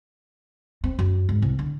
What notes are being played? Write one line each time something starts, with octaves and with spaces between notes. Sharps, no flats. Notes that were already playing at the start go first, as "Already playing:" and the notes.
C4
F#2
G#2
C2
D3